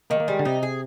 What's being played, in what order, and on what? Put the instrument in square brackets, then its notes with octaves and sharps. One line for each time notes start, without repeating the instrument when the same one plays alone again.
[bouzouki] D#3 [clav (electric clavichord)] A#3
[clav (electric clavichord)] A#3
[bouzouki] G3 [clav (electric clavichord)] G#3
[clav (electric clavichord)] D3
[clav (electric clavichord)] C3 [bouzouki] D#4
[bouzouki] G#4